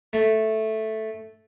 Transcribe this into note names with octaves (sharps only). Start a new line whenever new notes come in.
A3